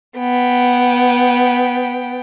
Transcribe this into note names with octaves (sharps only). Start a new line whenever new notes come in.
B3 G5